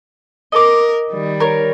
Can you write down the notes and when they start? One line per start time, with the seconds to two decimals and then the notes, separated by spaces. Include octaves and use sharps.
0.52 A#4 D#5 D6
1.11 D#3 G3
1.40 A#4 C#5